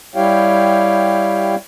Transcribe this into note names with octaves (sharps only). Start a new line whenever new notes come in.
G3 E4 G4 C#5 F5 G5